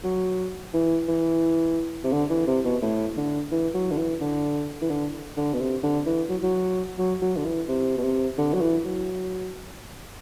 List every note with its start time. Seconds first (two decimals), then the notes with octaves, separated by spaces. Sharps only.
0.03 F#3
0.73 E3
1.08 E3
2.04 C3
2.12 D3
2.30 E3
2.47 C3
2.64 B2
2.82 A2
3.17 D3
3.52 E3
3.74 F#3
3.91 D3
3.98 E3
4.20 D3
4.82 E3
4.90 D3
5.37 D3
5.53 B2
5.60 C3
5.83 D3
6.06 E3
6.29 F#3
6.43 F#3
6.99 F#3
7.22 F#3
7.37 D3
7.45 E3
7.68 C3
7.98 B2
8.03 C3
8.38 D3
8.54 F#3
8.61 E3
8.85 F#3